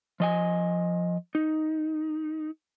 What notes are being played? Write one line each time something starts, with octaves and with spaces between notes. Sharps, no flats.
F3 D#5 G#5
D#4